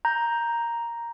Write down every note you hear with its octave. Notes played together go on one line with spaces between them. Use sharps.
A#5 G6